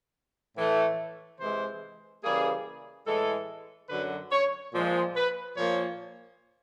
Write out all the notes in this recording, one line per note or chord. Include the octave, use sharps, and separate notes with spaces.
A2 E3 A3
C3 E3 G#3 C5
C#3 E3 G3 A#3 G#4
A2 E3 G#3 A4
F#2 D3 F#3 B4
C#5
A#2 F3 G#3
B4
A#2 F3 A#3 C#5